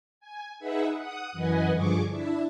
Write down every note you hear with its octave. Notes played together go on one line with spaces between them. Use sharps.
G#5
D#4 G#4 B4 E5 F#5
F#5 D#6
F#2 E3 B4 D#5 F#5 G#5
G2 D3 F3 G#4 C#6 D6
D4 E4 E5